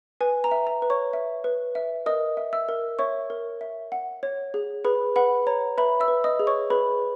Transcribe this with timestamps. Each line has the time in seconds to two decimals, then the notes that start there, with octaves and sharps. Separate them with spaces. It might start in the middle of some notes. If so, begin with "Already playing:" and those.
0.21 B4 G#5
0.44 A#5
0.51 E5
0.67 A#5
0.82 B4
0.90 C#5 C#6
1.13 E5
1.44 B4
1.75 E5
2.06 A#4 D#5 D#6
2.37 E5
2.53 E5 E6
2.69 A#4
2.99 C#5 E5 C#6
3.30 A#4
3.61 E5
3.92 F#5
4.23 C#5
4.54 G#4
4.85 G#4 B4 B5
5.16 B4 F#5 B5
5.47 C#5 A#5
5.78 B4 E5 B5
6.00 E5 E6
6.08 B4
6.24 D#5 D#6
6.39 G#4
6.47 C#5 C#6
6.70 G#4 B4 B5